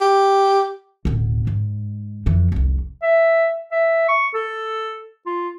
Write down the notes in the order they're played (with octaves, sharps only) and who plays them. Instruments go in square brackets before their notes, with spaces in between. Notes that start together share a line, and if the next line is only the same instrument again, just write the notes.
[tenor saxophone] G4
[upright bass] D1 B2
G#2
F2 E3
F1 C2
[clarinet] E5
E5
C#6
A4
F4